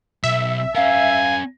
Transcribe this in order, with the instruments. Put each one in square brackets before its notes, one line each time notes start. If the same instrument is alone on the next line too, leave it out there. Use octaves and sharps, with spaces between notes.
[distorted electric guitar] B1 [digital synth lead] E5
[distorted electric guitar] C#4 A#4 [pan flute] F5 [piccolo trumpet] G#5